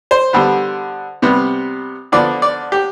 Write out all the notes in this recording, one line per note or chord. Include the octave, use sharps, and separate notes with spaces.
C5
D3 G3 B3
C3 G3 B3
D3 F3 B3 D5
D5
G4